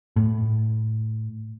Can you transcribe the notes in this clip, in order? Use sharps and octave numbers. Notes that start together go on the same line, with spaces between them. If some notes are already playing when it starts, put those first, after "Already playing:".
A2